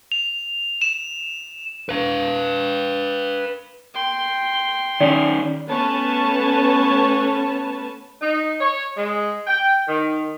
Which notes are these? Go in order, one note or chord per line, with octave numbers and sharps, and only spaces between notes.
F7
E7
B4 F5
G5 C6
D#3 C#4 D5
A3 B3 C#4 B4 C#5 A5
D#4
C#5
G#3
G5
D#3